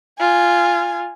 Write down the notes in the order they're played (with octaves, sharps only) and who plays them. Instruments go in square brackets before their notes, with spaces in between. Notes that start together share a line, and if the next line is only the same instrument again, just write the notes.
[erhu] F4 [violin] G#5